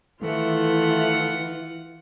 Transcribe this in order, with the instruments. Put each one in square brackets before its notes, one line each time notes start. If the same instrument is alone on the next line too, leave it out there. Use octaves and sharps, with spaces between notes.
[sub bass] D#3 [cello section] E3 [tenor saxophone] A3 [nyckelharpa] F4 F#5